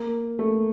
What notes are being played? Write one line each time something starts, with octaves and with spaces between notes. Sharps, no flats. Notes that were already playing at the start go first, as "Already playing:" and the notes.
Already playing: A#3
A3